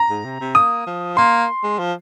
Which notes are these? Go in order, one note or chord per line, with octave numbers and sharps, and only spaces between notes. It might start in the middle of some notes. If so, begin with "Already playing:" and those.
Already playing: A#5
G#2
C3
C3
A#3 D#6
F3
A#3 C6
G#3
F3